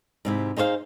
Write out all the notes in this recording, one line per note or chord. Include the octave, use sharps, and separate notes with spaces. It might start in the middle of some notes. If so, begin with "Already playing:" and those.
G#2 C3 E4
D#4 G#4 C5 D5 F5